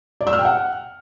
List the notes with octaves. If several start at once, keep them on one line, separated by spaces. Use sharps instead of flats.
D5
E6
F6
G5
F#5